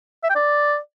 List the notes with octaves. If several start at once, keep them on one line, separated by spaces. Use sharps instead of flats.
E5
G5
D5